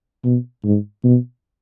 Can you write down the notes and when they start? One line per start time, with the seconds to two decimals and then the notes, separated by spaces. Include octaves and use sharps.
0.24 B2
0.64 G#2
1.04 B2